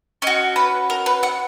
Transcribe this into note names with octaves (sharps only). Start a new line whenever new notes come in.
C#4 F#4 D#5
B4
A#4
B4
F#5